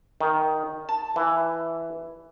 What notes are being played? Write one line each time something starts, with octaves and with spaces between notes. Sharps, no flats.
D#3
A5
E3